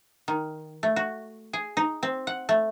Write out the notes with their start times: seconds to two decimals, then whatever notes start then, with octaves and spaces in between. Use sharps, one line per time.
0.28 D#3
0.83 A3
0.96 F#4
1.53 G#4
1.77 D#4
2.03 C4
2.27 F#5
2.49 A3